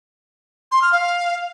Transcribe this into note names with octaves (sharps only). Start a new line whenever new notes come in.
C6
F6
F5